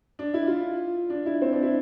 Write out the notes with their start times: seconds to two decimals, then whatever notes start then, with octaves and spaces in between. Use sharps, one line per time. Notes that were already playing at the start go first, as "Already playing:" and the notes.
0.19 D4
0.34 E4
0.47 F4
1.10 D4
1.26 E4
1.42 C4
1.53 D4
1.63 E4